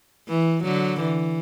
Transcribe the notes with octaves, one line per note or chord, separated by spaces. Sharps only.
E3
D3 F#3
E3